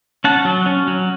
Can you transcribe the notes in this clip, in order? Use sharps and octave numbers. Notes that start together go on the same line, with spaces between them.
C#4 F#5 A5
F#3
C#4
F#3